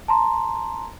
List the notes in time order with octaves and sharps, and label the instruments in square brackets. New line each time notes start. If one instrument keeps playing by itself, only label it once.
[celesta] A5 A#5 C6